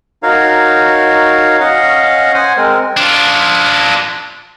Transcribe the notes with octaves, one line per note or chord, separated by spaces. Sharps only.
D#4 F#4 A#4 C#5 F5
C#4 D#5 F5 F#5
C5 F#5 G#5
G#3 C4 A#4
D4 F4